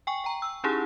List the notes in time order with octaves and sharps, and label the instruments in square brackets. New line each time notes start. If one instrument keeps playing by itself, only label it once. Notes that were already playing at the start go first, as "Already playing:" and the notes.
[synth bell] G5 G#5 C#6
G5 A#5
E6
C#4 D#4 E4 G4 G#4